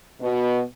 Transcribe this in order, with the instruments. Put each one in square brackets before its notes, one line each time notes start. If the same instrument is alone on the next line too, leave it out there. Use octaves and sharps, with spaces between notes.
[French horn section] B2